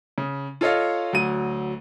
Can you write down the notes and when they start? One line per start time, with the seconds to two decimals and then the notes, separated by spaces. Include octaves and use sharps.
0.18 C#3
0.61 F4 A4 C#5 D#5 F5
1.13 D2 F#3 D#7